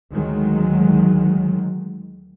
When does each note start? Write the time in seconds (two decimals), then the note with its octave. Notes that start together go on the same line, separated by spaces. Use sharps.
0.12 D2 D#3 F#3 G#3